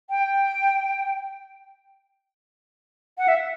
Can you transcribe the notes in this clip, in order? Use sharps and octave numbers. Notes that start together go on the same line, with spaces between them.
G5
F#5
E5